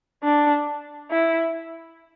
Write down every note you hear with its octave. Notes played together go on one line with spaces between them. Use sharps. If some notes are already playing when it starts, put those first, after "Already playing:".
D4
E4